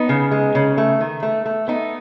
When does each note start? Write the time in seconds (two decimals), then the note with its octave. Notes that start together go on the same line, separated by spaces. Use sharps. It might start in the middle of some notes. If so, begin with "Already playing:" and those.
Already playing: B3 D#4
0.09 C#3
0.31 G#3
0.55 C#3
0.78 A3
1.00 D#3
1.23 A3
1.46 A3
1.68 A3 B3 D#4